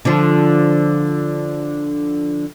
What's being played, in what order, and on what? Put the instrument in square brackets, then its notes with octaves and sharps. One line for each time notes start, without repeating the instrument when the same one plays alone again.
[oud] D3 F3